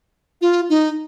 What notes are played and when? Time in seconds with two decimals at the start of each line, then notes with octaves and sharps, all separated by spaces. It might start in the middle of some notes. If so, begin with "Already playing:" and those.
0.41 F4
0.70 D#4